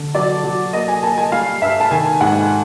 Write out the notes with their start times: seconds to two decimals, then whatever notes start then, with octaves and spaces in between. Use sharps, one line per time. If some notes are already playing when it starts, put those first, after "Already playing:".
Already playing: D3
0.15 F#3 D5
0.44 F#3
0.73 A#3 D#5
0.88 G#5
1.03 A#3 A5
1.18 G#5
1.32 G3 F5
1.61 G2 E5
1.80 A5
1.91 D#3 G#5
2.21 G#2 F#5